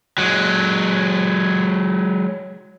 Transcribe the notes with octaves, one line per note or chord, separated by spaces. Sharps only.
F#3 G#3